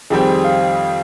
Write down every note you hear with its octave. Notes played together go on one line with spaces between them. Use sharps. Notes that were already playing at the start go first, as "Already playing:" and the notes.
F2 D#3 G3 C4 G4 G#4
F5